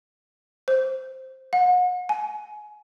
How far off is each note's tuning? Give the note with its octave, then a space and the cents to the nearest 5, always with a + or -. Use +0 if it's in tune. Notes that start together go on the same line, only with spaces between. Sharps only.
C5 +5
F#5 -35
G#5 +25